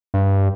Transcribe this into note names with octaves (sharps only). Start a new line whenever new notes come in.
G2